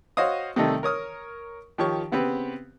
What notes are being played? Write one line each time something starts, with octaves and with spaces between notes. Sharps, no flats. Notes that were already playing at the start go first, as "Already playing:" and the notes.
F#4 C5 C#5 D#5 F5 D#6
C3 D#3 G3 A3 D#4 A4
A#4 C#5 D#6 F6
D#3 F3 G4 C#5 C#6
C#3 B3 C4 G4 B4